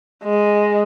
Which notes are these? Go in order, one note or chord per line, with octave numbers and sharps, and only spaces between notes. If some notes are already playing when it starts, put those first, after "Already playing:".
G#3